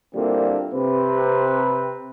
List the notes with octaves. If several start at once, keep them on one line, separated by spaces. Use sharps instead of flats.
A#2 D3 G3 A#3 C4 E4
C3 C4 B4